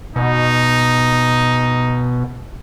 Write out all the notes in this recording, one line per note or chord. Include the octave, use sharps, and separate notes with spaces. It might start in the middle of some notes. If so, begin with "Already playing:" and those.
B2 D#4